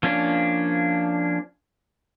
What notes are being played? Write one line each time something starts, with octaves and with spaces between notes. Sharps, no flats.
F3 A#3 C#4 D4